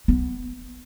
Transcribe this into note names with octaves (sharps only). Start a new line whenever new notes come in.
B3